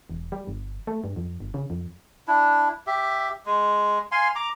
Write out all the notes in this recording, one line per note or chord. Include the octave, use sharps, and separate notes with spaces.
E1
G3
G1
A3
G2
F2
G1
C#3
F2
D4 E4
G4 E5
G#3
F5 G#5 C6
A#5 D6